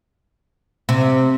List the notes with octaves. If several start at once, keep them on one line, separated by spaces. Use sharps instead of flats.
C3